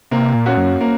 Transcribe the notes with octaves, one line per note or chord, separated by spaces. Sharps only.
C3 A#3
A#2
C#4 F#4
F#2
A#3